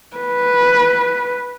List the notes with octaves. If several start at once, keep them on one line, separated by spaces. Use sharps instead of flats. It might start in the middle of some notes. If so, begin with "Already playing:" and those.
B4